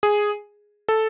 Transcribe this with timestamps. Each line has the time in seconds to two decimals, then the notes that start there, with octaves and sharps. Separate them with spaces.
0.03 G#4
0.89 A4